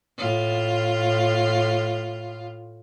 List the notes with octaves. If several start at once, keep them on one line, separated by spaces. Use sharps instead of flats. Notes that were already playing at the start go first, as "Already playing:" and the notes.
A2 F4